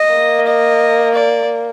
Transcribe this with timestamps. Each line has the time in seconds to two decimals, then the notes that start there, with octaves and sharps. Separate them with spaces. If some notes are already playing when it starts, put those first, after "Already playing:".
Already playing: D#5
0.13 A#3
0.47 D#5
1.14 D5